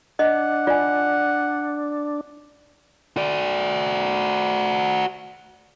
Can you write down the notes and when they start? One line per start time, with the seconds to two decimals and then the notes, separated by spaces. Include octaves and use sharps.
0.19 D4 D#5 F#5
0.67 F4 D5 G#5
3.17 F#4 D5